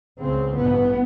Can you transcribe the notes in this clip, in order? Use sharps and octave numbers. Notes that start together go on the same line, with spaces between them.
C#2 C#3 C4
A1 G2 B3